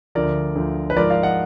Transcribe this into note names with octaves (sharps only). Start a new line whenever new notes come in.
D2 D3 F3 A#4 D5
D2 D3 F3
B4
G#2 F3 A#4 D5
D5 F5
D#5 F#5